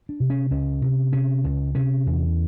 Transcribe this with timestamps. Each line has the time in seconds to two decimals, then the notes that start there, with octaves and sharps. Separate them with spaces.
0.09 D4
0.20 C3
0.30 C#4
0.50 C#2 C#4
0.82 C3
1.13 C3 C#4
1.44 C#2
1.75 C3 C#4
2.06 E2